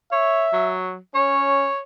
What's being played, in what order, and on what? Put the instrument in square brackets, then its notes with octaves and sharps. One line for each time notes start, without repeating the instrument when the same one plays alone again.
[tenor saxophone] C#5 [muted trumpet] E5
[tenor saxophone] F#3
[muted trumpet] C#4 [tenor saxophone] C#5